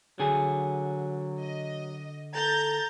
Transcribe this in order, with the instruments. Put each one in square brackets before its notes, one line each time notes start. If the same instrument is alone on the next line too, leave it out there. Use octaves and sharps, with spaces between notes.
[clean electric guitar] D3 G#4 [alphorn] F#3
[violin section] D#5
[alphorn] A4 [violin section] A#5 G6 A6